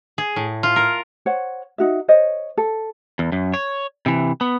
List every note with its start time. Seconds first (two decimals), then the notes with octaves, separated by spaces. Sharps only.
0.18 G#4
0.36 A2
0.63 F4
0.76 A#4
1.26 C5 C#5 F#5
1.78 D#4 F#4 E5
2.08 C5 C#5 D#5
2.57 A4
3.19 E2
3.32 F#2
3.54 C#5
4.06 C3 E3
4.41 B3